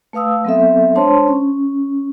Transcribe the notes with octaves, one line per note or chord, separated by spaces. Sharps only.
A3 B4 F5 D#6 E6
F#3 B3 C4 A4 E5
G#3 D4 C5 C#5 A5 C6
C#4